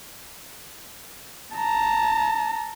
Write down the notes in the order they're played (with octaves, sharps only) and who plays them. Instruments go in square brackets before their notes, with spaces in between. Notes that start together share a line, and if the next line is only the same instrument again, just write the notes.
[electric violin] A5 A#5